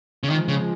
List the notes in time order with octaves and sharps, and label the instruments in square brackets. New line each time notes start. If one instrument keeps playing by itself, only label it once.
[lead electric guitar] C#3
[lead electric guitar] D#3 [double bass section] F3 G#3
[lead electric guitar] C#3